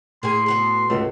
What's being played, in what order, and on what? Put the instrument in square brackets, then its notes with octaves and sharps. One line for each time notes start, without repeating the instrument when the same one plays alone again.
[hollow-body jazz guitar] A2 [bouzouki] A#3 G#4 [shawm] C6
[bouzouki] B3 F#4 A4
[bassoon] C#2 [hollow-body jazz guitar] G#2 C#3 A3